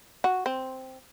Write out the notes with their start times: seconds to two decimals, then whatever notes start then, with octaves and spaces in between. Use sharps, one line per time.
0.24 F#4
0.46 C4